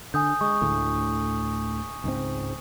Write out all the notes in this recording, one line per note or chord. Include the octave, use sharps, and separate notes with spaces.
D3 G#5 D#6 G6
G#3 C#6 D#6
D2 A2 D3
C#2 G#2 C4